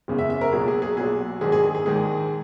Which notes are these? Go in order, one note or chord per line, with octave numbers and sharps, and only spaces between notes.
F#1 E2 C#3 G#3
E5
E5
A#4
B1 A#2 F#3 G#4
G#4
G#4
B1 A#2 F#3 G#4
A#1 G#2 D#3 G#3 G#4
G#4
G#4
G#4
A#1 G#2 D#3 G#3 G#4